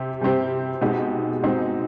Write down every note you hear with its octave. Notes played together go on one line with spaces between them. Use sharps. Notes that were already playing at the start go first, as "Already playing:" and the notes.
Already playing: C3 C4 G4
C3 G3 C4 G4
B2 G#3 C4 D#4 G4
B2 G#3 C4 D#4 G4